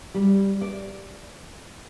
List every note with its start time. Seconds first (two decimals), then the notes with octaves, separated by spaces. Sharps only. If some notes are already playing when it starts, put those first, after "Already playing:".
0.14 G3
0.61 D5